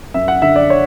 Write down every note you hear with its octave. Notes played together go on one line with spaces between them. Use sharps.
F#2 E5
F#5
D3 E5
D5
C#5